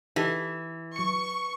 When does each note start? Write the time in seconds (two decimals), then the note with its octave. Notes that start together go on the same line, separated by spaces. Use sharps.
0.16 E3 D#4 G4 A4
0.96 F#3 C#6 C#7